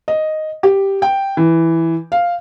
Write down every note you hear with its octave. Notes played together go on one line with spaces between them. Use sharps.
D#5
G4
G5
E3
F5